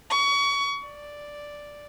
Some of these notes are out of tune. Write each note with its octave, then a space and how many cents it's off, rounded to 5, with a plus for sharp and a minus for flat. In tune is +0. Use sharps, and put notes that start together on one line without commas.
C#6 +30
D5 +0